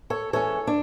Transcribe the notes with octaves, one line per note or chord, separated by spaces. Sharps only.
A4 C#5
E3 G#3 C#4 A4 C#5
D4